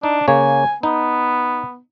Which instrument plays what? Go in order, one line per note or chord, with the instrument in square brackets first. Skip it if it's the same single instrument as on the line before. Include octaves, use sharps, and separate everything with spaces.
[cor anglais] D4 [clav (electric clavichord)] D#4
[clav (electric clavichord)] C#3 A#3 C#5 [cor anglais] G#5
[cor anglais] B3 [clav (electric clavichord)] D#4